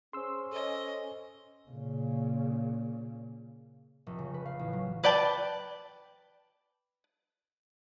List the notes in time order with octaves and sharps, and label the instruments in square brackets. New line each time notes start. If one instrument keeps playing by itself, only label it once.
[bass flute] C#4 [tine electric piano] G#4 C5 [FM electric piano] C6 E6
[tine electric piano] A4 C5 C#5 [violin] D#5
[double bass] A#2 C#3
[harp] F1
C#3
B4
F5
A1
F#3
[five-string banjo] B4 D5 G5 A5